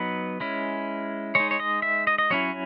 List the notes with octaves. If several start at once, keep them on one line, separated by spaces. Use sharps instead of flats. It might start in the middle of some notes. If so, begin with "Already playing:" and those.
Already playing: F#3 B3 D#4 B4
G#3 C#4 E4
G#3 D#4 C#5
C#5
D#5
E5
D#5
D#5
F#3 C#4 E4 C#5